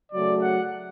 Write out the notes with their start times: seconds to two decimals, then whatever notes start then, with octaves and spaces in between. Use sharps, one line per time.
0.11 C#3 F#3 A3 D5
0.41 F#5